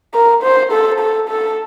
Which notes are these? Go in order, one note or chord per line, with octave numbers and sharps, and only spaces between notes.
A#4
C5
A4
A4
A4